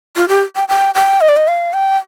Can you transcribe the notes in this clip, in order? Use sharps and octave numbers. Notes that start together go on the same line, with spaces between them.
F4
G4
G5
G5
G5
D#5
D5
D#5
F5
G5